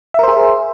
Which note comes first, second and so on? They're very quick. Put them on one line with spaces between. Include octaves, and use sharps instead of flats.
E5 A#4 C5 G#4